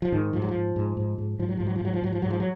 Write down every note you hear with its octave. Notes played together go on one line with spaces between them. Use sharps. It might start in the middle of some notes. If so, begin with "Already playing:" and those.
F3
G#2 D#3
G#2 F3
F#3
F3
G#2
G#2
G#2
G#2
G#2 F3
F#3
G#2 F3
F#3
F3
G#2 F#3
F3
G#2 F#3
F3
G#2 F#3
F3
F#3